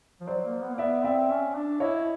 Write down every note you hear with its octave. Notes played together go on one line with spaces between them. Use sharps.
F3
F#3 C5 D5
A#3
B3
A#3
B3 D5 E5
C4 D5 E5
C#4
D4
E4 C#5 D#5